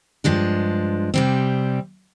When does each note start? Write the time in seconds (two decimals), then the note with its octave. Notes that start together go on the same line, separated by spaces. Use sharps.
0.24 G2 F3 G#3 D4
1.14 C3 G3 C4